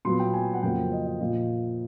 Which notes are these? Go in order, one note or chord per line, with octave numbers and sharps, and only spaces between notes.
A#2 F#3 B3 C6
G5
G#5
F#5
F2 C#3 F#3 A#3 G5
D#5
D#5
A#2 F3 A#3 D#5